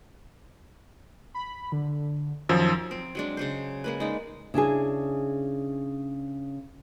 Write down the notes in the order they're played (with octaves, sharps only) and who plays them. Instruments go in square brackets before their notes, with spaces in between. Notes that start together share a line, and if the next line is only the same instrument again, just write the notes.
[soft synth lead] B5
D3
[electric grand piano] F#2 F3 E6 [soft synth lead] D#3
[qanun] C4
F#3 G#3 D4
C#3 F#3 C5
G#3 A#3 B4
G#3 D#4 D5
[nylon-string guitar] C#3 D4 E4 G#4